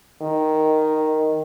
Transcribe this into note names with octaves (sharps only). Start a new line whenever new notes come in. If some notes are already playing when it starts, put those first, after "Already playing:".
D#3